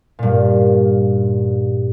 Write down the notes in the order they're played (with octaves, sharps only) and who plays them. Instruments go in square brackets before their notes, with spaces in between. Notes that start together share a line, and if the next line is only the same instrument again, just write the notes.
[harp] G2 A#2